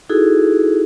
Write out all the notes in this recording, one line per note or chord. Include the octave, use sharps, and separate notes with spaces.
D#4 E4 F#4 G#4 A4